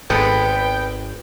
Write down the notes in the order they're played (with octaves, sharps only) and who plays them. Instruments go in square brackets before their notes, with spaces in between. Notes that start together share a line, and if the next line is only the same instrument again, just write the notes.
[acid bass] G#1 [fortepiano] G#3 B3 A4 [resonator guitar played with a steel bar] B4 [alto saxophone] G5